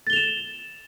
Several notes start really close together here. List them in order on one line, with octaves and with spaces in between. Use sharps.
A6 G7 F7 E7